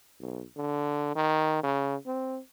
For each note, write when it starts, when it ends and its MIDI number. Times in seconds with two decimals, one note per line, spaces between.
0.20 0.43 35
0.57 1.14 50
1.15 1.59 51
1.63 1.96 49
2.06 2.40 60